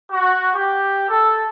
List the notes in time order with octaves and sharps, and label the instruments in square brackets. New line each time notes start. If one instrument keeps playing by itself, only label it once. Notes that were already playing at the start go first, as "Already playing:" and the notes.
[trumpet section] F#4
G4
A4